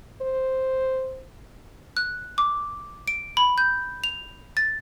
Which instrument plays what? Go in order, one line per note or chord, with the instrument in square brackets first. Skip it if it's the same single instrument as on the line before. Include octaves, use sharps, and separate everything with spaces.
[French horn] C5
[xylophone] F#6
D6
D7
B5
G6
F7
A6